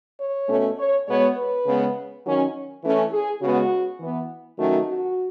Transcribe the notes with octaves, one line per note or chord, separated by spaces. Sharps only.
C#5
B2 A3 C#4
C#5
B2 G#3 B3 C#5
B4
C#3 G#3 B3
D#3 F#3 C#4
E3 A3 C#4
G#4
C#3 G#3 B3 F#4
E3 B3
D#3 F#3 A3 C#4 F#4
F#4